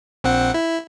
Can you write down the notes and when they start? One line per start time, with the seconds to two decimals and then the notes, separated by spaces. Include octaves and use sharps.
0.24 A#1 C4 F#5
0.54 E4